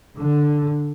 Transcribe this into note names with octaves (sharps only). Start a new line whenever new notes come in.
D3